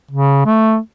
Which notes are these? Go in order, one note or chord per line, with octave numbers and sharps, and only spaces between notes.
C#3
A3